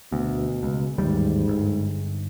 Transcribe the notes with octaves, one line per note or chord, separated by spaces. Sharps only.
D2 B2
C#2
A1 D#2 G#2 G3
G1